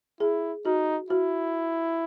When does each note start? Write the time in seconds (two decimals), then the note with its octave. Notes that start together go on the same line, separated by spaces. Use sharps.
0.20 E4 G#4
0.65 D#4 F#4
1.10 E4 F#4